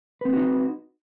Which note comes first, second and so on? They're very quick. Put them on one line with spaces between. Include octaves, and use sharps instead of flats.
B4 C4 B3 F#4 D#4